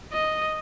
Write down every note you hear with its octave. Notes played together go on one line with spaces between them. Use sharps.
D#5